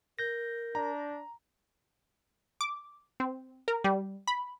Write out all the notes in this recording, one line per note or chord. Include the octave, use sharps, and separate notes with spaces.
A#4 G6 A#6
D4 A#5
D6
C4
A#4
G3
B5